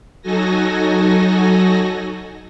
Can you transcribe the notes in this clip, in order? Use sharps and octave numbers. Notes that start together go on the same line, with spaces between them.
F#3 D#4 F#4 A4 G#5 A#6